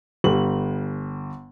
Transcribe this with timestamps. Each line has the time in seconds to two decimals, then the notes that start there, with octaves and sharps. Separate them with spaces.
0.24 G1 G3 F#7